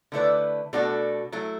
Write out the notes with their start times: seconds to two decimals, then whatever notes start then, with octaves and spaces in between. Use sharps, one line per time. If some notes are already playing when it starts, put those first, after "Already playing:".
0.12 D3 A3 E4 B4 D5
0.73 B2 A3 D4 F#4 A4
1.32 F#3 A3 E4